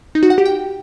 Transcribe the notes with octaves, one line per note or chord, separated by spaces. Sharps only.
D#4
F#4
F#5
G4
G5